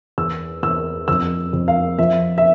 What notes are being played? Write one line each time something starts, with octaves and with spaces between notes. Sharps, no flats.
E2 E6
E2 E6
F2 E6
F2
F5
F3 E5
E5